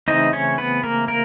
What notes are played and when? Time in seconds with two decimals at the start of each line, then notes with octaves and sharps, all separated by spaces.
0.08 C#3 E3 A3 C4 D#4 D#5
0.33 C#4 C#5
0.58 B3 B4
0.83 A#3 A#4
1.08 A#3 A#4